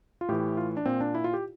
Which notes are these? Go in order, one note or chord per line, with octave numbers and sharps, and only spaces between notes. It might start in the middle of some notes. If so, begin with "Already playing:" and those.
F4
A2 E3 G4
F4
D4
A#2 C4
D4
E4
F4
G4